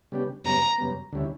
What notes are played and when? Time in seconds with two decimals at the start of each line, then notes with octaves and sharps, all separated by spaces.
0.12 C#3 G3 B3 D4 G4
0.44 F#2 C#3 G3 B3 A#5
0.78 F#2 C#3 G3 B3
1.12 D2 D3 G3 C#4 E4